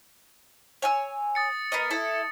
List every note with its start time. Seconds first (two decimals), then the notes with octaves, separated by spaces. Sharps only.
0.82 C#5 G#5 E6
1.35 D#6 A6 C#7
1.72 B3 A#4 D#5
1.91 E4 A4